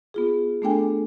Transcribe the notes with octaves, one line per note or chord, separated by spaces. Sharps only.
B3 F4 G#4
A3 B3 D4 A4 G5 G#5